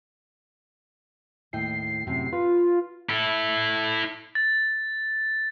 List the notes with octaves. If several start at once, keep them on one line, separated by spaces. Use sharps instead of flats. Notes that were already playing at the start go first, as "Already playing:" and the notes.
D#2 A2 G5 C7
F#2 A2 C3
F4 B4
E4 A4
A6